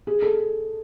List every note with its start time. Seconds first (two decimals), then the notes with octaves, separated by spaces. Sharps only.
0.07 G#4
0.22 A4